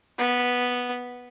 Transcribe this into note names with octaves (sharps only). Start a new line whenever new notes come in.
B3